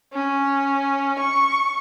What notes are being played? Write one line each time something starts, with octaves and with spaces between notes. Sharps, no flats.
C#4
C#6